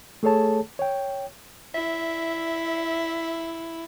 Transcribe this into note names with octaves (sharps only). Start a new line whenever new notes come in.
A3 G#4 A4 C#5 A5
C#5 G5
E4 E5